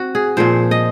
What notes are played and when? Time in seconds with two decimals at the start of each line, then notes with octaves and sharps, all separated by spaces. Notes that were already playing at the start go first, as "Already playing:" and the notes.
Already playing: C4 F#4
0.15 G#4
0.37 A#2 F3 C5
0.71 D#5